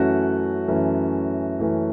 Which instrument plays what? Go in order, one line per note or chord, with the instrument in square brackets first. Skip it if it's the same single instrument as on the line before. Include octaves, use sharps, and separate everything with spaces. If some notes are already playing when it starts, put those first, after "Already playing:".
Already playing: [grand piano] F#2 E3 A3 C#4 F#4
F#2 E3 A3 C#4
F#2 E3 A3 C#4